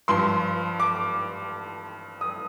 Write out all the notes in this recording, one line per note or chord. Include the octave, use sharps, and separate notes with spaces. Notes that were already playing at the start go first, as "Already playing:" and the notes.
G2 F3 C6
D6
D#6